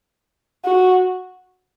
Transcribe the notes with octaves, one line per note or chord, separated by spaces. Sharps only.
F#4